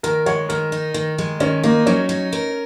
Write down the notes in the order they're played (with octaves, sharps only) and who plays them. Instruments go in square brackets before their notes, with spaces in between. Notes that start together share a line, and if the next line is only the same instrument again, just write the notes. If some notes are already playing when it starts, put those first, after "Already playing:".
[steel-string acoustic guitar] D#3 [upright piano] A#4
[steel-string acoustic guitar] G#3 [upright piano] C#5
[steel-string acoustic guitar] D#3 [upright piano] A#4
[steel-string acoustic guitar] D#4
D#3
G#3
[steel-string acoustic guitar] D#3 [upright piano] C#4
[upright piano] A#3 [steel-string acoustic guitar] D#4
[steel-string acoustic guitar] F#3 [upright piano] C#4
[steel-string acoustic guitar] D#4
A#4